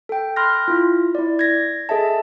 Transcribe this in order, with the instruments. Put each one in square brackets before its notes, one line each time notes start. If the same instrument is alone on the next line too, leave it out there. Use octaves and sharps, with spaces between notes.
[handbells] A4 G5
B5 C6 F6 F#6 A#6
E4 F4
E4 D5
G#6 A#6
G#4 A4 D#5 E5 A5